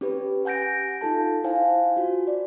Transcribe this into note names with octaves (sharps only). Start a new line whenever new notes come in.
C#4 G4 B4
F#5 G#5 G6 A#6 D7
D#4 F4 A4 A5
E4 C5 F5 G#5
F4 F#4
D5